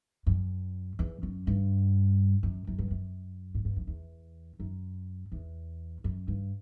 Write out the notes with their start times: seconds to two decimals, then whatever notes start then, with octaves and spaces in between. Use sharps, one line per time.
0.27 F#2
0.99 E2
1.23 F#2
1.47 G2
2.43 F#2
2.67 F#2
2.79 G2
2.91 F#2
3.55 A2
3.65 G2
3.76 F#2
3.87 E2
4.60 F#2
5.32 E2
6.04 F#2
6.28 G2